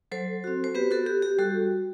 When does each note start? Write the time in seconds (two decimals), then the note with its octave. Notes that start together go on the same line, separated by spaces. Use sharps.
0.12 F#3 A4 C5
0.44 C4 F#4
0.64 C5
0.75 B3 G4 B4
0.91 F#4 A4
1.06 F#4 G4
1.22 G4
1.38 G3 F#4 A4